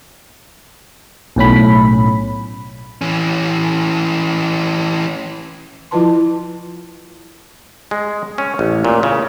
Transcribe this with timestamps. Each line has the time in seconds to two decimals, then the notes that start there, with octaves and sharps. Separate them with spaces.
1.36 B1 A2 C#4 B5
3.01 E3 C#4
5.91 F3 E4 F4 B4 A5 C6
7.91 G#3
8.38 C#4
8.59 A1
8.85 A#2
9.03 C#3